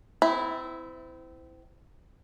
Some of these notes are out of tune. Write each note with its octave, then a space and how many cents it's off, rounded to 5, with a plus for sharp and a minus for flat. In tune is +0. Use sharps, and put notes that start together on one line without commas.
C4 -30 E4 +0